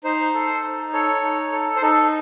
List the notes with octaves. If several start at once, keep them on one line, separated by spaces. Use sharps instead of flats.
D#4 C5
A4
D#4
A4 C#5
D#4
A4
C5
D#4 A4